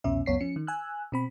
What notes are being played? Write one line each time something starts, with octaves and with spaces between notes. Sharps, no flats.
C2 F2 B2 C#4 E5
C#2 F#2 B3 C#5 B6 C7
F3 C#4 C#7
D#3
G#5 E6 F#6
B2 C4 B5